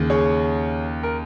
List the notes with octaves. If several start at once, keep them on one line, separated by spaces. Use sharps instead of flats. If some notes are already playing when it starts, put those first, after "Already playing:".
Already playing: D#2 C#3
G#4 C#5
A#4